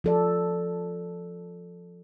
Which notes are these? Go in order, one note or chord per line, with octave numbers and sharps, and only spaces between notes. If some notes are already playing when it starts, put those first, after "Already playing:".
F3 A4 D5